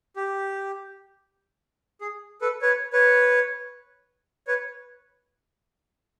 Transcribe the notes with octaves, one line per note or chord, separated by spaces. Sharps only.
G4
G#4
A4 B4
B4 C#5
B4 C#5
B4 C#5